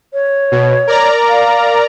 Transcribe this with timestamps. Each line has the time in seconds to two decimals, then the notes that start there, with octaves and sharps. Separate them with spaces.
0.13 C#5
0.52 B2
0.87 A#4 D5 A#5
1.29 F5